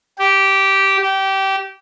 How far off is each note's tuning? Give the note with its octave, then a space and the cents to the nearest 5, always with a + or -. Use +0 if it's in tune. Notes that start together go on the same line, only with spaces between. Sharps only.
G4 -10
G4 -20